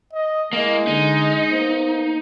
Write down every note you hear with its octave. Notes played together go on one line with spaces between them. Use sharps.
D#5
G#3 A#3 E4 D#5
D3 D#4
A#3 B3 C5